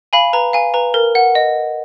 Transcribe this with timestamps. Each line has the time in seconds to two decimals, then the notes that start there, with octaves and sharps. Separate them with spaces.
0.13 F5 G#5 B5
0.33 B4 A#5
0.53 F5 G#5
0.74 B4 A#5
0.94 A#4
1.15 F#5
1.35 D#5